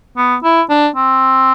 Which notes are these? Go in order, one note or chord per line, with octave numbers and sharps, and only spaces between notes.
B3
E4
D4
C4